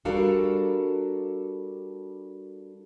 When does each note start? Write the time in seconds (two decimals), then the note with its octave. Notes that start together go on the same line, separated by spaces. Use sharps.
0.05 G3 D4 F#4 A4 A#4 F5